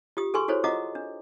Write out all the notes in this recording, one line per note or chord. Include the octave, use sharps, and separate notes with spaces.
F4 G4 D#6
G#4 A4 B4 G#5 C6 C#6
E4 F#4 A4 C5 C#5
F4 D#5 F#5 A#5 D6 D#6
D4